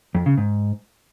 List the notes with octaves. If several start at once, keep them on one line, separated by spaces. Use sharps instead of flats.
F2
C#3
G#2